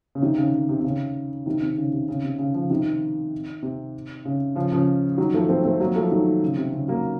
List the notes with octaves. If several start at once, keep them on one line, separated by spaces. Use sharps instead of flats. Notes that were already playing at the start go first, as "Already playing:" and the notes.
C#3
C3 D#3
C#3
C#3
C3
C3
C#3
C3 D#3
C3 D#3
C#3
C3
C#3
C3
C#3
C#3 F3
C3 D#3
C3
C#3
C#3 F3
C#3 F3
D#3 F#3
F3 A3
A3 C4
A3 C4
F#3 A#3
F3 A3
D#3 F#3
C#3
C3
C#3
F#3 A#3